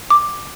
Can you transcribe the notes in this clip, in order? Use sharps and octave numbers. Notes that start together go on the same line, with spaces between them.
D6